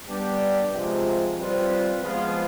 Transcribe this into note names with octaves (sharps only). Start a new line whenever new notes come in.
G3 B3 D4 G4
C3 F3 G#3
G3 C4 F4 B4
F3 G#3 B3 F4 G#4